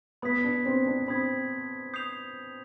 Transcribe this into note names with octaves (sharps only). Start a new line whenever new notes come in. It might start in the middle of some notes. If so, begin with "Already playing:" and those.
B3 B5 D#6 G#6 B6
D4
C4
D4
C4 B5 D#6 G#6 B6
D#6 G6 C7 F7